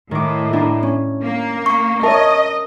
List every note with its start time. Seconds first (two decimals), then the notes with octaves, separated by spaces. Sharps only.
0.11 A2 D#3 D6
0.53 D4 E4 A#5
0.83 C#4
1.22 A#3
1.66 C#6
2.03 A#4 C#5 D#5 E5 A5